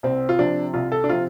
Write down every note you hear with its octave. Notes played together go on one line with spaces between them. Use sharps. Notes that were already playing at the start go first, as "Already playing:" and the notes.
C2 C4
F4
C3 F3 D4
C2 F4
A4
D4
C3 F3 F4